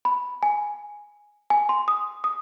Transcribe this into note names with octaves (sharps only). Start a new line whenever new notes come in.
B5
G#5
G#5
C6
D#6
D#6